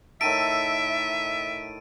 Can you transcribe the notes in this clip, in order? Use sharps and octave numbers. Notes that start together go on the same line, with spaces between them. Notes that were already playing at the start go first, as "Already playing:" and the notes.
A2 D#3 A4 E5 D7 D#7